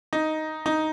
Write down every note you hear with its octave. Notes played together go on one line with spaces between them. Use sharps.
D#4
D#4